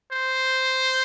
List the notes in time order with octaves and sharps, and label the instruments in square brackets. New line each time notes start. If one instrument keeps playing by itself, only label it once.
[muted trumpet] C5